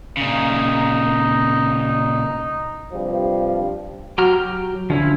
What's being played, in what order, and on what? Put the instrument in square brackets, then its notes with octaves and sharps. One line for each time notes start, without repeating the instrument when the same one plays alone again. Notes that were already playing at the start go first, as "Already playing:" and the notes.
[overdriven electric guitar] A#2 C#3 [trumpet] D#4
[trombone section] G2 C3 F3 G3
[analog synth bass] F#3 [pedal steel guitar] G4 A#5 F6
[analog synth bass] D2 [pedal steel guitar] F3 C#4 E4